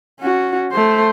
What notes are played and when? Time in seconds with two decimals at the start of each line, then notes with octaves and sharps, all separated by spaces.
0.20 C#4 F#4
0.72 A3 C5